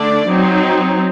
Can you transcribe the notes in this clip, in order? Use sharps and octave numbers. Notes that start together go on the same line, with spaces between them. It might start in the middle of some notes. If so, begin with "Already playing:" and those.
Already playing: D3 A3 D4 D5
F#3 C4 D#4